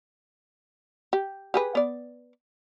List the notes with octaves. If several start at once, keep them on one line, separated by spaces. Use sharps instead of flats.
G4
G4 G#4 B4
B3 D5